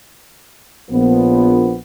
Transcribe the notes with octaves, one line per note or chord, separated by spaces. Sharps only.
A#1 F3 B3